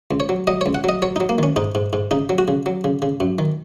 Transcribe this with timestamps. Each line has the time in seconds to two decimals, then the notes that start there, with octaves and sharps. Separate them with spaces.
0.11 C#2
0.20 C#5
0.29 F#3
0.47 F#3 D#5
0.61 C#2 C#5
0.75 F#5
0.84 F#3 D#5
1.02 F#3 C#5
1.16 F#3 D#4
1.29 A#3
1.38 D#3 C#4
1.56 G#2 D#4
1.75 G#2
1.93 G#2
2.11 C#3 D#4
2.29 F#3
2.38 F#4
2.48 C#3
2.66 F#3
2.84 C#3
3.02 C#3
3.20 F#2
3.39 D#3